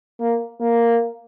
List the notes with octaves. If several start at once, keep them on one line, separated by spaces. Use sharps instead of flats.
A#3
A#3